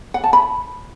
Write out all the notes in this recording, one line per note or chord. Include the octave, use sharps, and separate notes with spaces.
F#5
A5
B5